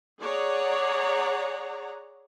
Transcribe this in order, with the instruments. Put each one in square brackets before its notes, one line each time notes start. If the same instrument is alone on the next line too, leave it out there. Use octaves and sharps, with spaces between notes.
[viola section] G#4 C#5 D5 F#5 A#5